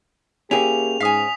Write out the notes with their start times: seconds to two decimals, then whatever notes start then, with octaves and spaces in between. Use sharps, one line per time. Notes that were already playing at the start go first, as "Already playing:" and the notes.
0.51 A#3 C#4 E4 G4 G#4 F7
1.00 G#2 F5 G#5 D#6 B6